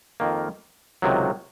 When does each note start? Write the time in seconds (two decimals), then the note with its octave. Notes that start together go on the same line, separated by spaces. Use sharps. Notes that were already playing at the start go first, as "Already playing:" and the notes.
0.20 F2 D#3 A#3
1.02 C#2 C3 D#3 F#3